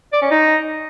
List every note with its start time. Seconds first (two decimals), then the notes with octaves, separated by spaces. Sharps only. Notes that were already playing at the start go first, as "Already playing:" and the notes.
0.13 D5
0.22 C#4
0.31 D#4